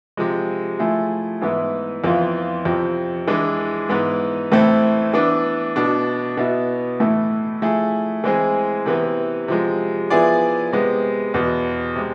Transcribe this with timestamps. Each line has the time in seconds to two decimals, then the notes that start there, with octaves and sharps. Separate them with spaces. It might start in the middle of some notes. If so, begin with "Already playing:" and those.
0.17 C3 F3 G#3
0.79 F3 A3 E4 G#4
1.41 G#2 E3 B3 E4
2.04 F2 E3 B3 F4
2.65 F2 C3 F3
3.28 E3 G#3 D4
3.89 G#2 E3 B3
4.52 A2 E3 A3 C4
5.14 E3 B3 D4
5.76 B2 B3 D4
6.37 B2 B3 E4
7.00 A2 E3 A3 E4
7.61 F3 A3 E4 G#4
8.24 E3 G#3 C4 G#4
8.86 C3 E3 B3
9.48 C3 F3 G#3
10.10 F3 B3 E4 G#4 D5
10.72 C3 G#3 B3
11.34 E2 B2 B3
11.96 C3 G#3